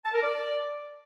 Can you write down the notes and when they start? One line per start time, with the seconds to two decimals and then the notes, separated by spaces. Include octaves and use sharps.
0.05 A5
0.14 A#4
0.22 D5